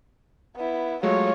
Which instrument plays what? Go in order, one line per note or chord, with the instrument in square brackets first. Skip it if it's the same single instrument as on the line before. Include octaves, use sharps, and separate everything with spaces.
[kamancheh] B3 E4
[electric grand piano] F#3 G#3 A3 [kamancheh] F4 C#5